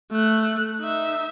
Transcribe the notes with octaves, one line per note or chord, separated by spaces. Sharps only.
A3 F#6
D#4 E5